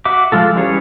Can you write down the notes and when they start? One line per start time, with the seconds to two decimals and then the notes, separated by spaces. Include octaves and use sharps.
0.05 F#4 E5 D6
0.32 F3 G#3 F4 A4
0.56 E3 G3 C#4 G#4 C#5